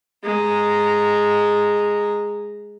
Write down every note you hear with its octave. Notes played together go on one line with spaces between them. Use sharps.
G#3 A#5